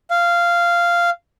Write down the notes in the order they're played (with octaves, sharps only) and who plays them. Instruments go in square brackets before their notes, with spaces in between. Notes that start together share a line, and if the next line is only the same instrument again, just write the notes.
[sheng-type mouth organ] F5